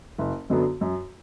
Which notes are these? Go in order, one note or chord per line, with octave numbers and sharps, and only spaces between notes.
F#1
F#2 D3 F#3 B3
F#2